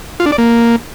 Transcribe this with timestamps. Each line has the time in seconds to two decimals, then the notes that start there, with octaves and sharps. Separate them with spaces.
0.20 F4
0.26 D4
0.32 D5
0.38 A#3